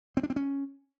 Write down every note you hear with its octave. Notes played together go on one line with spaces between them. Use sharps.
C4
D4
C4
C#4